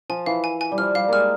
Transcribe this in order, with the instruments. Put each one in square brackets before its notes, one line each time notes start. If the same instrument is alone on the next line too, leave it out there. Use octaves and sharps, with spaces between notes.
[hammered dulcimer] F3 [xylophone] G#5
[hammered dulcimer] E3 [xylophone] F5
[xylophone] G#5
G#5
[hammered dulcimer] G3
[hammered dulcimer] F3 [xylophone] F6
[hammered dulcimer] G3 [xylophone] F5
[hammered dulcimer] G#3 A#3 [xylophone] F6